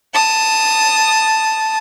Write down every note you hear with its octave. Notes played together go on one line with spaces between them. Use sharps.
A5 D#6